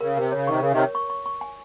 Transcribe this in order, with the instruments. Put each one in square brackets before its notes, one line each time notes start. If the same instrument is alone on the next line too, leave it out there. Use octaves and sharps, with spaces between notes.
[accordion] C#3 [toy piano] A#4
[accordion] C3 [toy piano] A#4
[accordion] C#3 [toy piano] C#5
[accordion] C3 D#3 [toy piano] C#6
[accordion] C#3 [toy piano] A#4
[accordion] C3 D#3
[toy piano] C#5
C#6
C#6
C#6
G#5